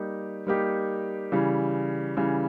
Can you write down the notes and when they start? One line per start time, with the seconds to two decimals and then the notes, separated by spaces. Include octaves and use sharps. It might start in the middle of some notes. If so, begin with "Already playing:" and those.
Already playing: G3 A#3 D#4 G4
0.47 G3 A#3 D#4 G4
1.32 C#3 E3 G3
2.17 C#3 E3 G3